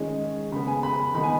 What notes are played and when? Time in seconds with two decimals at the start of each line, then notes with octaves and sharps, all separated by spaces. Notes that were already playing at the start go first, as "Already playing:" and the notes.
Already playing: D#3 G#3 C#4
0.52 C#3 B3 B5
0.67 G#5
0.83 B5
1.14 D#3 B3 B5
1.23 G#5